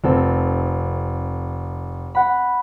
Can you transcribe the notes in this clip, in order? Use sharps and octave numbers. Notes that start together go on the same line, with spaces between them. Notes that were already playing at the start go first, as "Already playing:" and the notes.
F1 C4 A4
F#5 B5